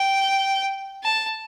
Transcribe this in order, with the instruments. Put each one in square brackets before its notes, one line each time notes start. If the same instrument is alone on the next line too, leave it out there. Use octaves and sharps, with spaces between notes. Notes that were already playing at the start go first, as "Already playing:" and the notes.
Already playing: [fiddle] G5
A5